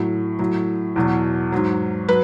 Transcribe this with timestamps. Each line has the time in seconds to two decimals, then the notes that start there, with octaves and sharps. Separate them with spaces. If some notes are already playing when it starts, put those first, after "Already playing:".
Already playing: A2 F#3
0.39 A2 F#3
0.96 E2 B2 F#3
1.52 G#2 F#3
2.09 F#3 B4